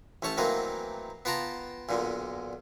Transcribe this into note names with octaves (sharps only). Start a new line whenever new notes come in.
A1 A3 C#5 A5
D#3 E3 F#3 A3 A#3 C4
B3 F4 G5 A5 A#5
B1 A#2 D3